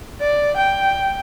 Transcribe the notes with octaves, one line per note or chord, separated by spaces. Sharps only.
D5
G5